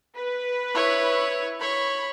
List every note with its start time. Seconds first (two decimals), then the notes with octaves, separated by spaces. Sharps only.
0.15 B4
0.74 E4 C#5
1.60 C#5 B5